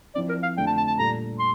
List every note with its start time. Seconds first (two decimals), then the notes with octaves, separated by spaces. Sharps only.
0.15 F3 C4 E4 D5
0.29 A#4
0.43 F5
0.57 F2 D3 A3 D4 G5
0.67 A5
0.77 A5
0.88 A5
0.98 A#2 G3 D4 A4 A#5
1.39 C6